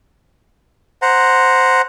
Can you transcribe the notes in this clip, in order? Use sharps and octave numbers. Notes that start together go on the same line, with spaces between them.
C5 F#5 A#5